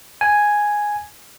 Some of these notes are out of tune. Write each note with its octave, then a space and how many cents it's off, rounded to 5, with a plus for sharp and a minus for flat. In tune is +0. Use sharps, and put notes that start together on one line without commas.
G#5 +0